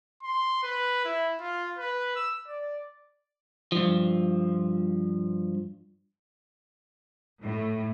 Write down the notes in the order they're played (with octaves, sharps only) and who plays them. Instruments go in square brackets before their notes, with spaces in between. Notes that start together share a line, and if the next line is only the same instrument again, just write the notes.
[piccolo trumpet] C6
B4
E4
F4
B4
E6
D5
[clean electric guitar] G2 F3
[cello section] A2